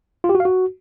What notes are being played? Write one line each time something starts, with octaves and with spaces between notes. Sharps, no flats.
F4
G4
F#4
F5
F#4